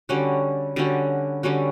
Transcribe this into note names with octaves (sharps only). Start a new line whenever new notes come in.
D3 G3 C#4 F#4
D3 G3 C#4 F#4
D3 G3 C#4 F#4